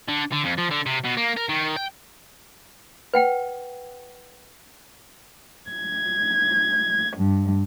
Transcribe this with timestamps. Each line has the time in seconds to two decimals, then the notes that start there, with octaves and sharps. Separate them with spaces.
0.08 D3
0.32 D3
0.44 F2
0.58 F3
0.71 D3
0.86 C3
1.05 B2
1.17 A#3
1.37 A#4
1.49 D#3
1.76 G5
3.14 B4 F#5 G5
5.68 G#6
7.16 G2